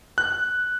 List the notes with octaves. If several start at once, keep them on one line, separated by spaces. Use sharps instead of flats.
F#6